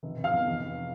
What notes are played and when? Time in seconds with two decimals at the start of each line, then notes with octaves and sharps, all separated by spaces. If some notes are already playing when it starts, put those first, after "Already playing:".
0.03 F1
0.18 F1
0.24 F5 F6
0.32 E2
0.47 F1
0.60 F1